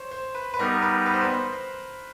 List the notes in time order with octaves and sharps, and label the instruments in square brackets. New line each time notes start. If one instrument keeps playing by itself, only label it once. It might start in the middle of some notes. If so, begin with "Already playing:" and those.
Already playing: [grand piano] C5 C#5
C5
B4
B4
[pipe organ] G3 B3 D#4 [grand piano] A#4
[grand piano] B4
B4
C5
B4
C5
C5